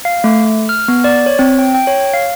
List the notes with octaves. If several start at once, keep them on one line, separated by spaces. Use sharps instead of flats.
F5
A3
F6
B3
D5
C#5
C4
G5
G5
C#5
F5